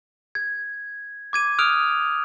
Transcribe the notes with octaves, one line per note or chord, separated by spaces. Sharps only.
G#6
D6 G#6 D#7
D#6 F6 F#6 D7 F7